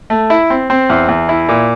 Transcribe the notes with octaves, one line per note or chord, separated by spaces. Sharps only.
A3
E4
C4
C4
E2
E2
E4
A#2